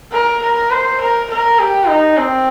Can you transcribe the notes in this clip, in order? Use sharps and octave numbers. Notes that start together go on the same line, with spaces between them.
A#4
A#4
C5
A#4
A#4
G4
D#4
C4